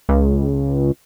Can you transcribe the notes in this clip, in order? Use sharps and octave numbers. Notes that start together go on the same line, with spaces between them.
C#2